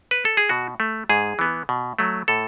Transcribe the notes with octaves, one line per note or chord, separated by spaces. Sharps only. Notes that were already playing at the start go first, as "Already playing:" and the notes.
B4
A4
G#4
B2 F#4
A3
G#2 G#4
E3 B3
B2
F#3 A3
A2 A4